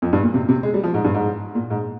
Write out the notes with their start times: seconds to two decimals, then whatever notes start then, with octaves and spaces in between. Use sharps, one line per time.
0.02 F2
0.13 G2
0.23 A#2
0.34 C3
0.49 C3
0.63 G#3
0.74 G3
0.83 F3
0.94 G#2
1.04 G2
1.14 G#2
1.55 A#2
1.70 G#2